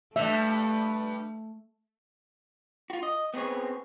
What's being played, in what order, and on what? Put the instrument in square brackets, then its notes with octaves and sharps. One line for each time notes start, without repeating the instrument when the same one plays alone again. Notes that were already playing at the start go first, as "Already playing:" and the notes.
[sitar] G2 G3 [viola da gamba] A3 [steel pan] E5
[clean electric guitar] F4 F#4
D#5
B3 C4 G#4 C#5